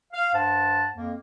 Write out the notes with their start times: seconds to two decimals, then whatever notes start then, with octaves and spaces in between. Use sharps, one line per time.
0.12 F5
0.34 G2 C5 F#5 A5
0.95 F2 A#3